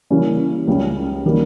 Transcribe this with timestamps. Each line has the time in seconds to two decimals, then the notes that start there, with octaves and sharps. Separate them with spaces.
0.10 C#3 E3 G3 A#3 C#4
0.68 C#2 C#3 G3 C#4
1.26 D#3 G3 A#3